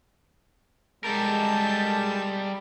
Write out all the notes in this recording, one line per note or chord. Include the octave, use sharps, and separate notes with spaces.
G3 G#3 A4 A#4 A5 G6